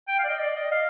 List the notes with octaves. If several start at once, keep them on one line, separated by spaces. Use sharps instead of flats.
G5
F5
D5
D#5
D5
D#5
F5